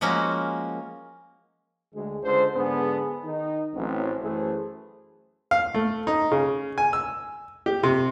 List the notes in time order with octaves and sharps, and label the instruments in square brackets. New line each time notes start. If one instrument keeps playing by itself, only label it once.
[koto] F3 G#3 A#3 C#4 F#4 A#4
[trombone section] D2 G#3
C#2 D3 G#3 C5
G#2 D3 B3 D4 G#4
D#3 D#4
A1 F#3 C4
F#2 E3 A3 G#4 A4 C5
[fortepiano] F5
A3
D#4
C#3
G#5
E6
G4
C3